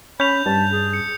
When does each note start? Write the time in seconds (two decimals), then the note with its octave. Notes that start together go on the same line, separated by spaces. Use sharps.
0.20 C#4 B5 G6 F7
0.46 G2 A5
0.71 G#4
0.93 C#7